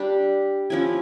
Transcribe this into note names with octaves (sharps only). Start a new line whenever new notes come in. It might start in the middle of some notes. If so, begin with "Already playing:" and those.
Already playing: G3 D4 G4
F3 C#4 E4